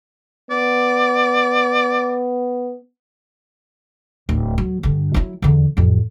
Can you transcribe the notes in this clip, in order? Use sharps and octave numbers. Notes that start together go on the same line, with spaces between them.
B3 D5
D1
F#3
G2 D3
F#3 E4
E2 D3
A1 F2